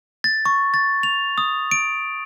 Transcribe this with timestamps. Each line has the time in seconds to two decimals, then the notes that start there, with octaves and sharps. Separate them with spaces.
0.24 A6
0.46 C#6
0.74 A6
1.03 F7
1.38 D#6
1.71 D7